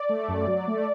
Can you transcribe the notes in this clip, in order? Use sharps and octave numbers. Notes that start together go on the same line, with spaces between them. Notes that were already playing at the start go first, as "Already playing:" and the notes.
Already playing: D5
A3
F#2
F#3
A3